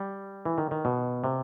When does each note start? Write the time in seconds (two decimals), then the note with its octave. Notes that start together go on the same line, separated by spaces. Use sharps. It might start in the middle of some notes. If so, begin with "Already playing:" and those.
Already playing: G3
0.45 E3
0.58 D#3
0.71 D#3
0.85 B2
1.24 C3